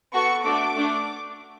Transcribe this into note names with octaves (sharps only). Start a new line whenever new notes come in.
B3 F#4 A4 C#6
A3 D4 F#4 A4 D6
A3 D4